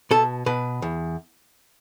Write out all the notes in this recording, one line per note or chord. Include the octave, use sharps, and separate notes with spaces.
B2 A4
B2 B4
E2